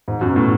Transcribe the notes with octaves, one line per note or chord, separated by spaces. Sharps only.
G#2
F#2
B2
A2